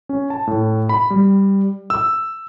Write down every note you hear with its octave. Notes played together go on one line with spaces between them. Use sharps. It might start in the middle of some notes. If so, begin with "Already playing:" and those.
C#4
A5
A2
B5
G3
E6